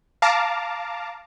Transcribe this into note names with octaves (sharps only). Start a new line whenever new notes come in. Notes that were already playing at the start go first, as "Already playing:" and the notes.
F5 A5 A#5 D6